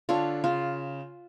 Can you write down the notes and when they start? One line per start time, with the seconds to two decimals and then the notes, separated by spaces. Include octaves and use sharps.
0.09 D3 D4 F4 A4 C#5
0.44 C#3 F4